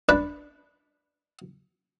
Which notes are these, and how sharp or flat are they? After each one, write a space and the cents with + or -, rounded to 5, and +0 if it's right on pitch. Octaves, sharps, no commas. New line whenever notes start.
D4 +0 B4 +0